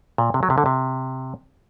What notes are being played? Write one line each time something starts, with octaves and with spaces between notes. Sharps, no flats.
A#2
C3
F#3
C3
D3
C3